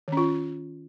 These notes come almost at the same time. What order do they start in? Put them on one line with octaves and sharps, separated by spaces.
D#3 C#4 F4